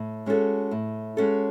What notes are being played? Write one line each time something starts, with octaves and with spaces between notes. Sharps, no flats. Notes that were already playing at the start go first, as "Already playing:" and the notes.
Already playing: A2
G#3 C#4 F#4 A4
A2
G#3 C#4 F#4 A4